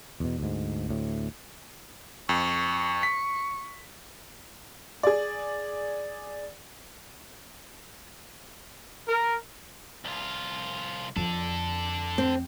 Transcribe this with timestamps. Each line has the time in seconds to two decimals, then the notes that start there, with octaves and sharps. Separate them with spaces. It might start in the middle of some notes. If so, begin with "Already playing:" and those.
0.20 E2 B2
0.39 D2 G#2
0.89 D2 A2
2.29 F2 C#6
3.03 B6
5.03 G#4 D5
9.08 A#4
10.05 C2 F4
11.16 F2 D4 A4
12.18 C4